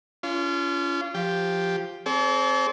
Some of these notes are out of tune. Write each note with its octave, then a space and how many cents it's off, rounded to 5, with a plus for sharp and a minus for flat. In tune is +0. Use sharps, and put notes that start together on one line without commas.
C#4 +35 F4 -30
F3 +0 G4 +0
C4 +10 A4 -45 D5 -45